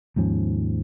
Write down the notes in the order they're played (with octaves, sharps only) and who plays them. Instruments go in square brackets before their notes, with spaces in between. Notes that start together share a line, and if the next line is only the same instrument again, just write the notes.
[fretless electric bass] D#2 G#2 F3 C#4